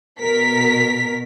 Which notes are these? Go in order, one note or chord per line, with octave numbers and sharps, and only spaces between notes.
B2 A#4 B6